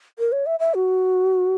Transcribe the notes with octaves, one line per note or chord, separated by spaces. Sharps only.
A#4
C#5
E5
E5
F#4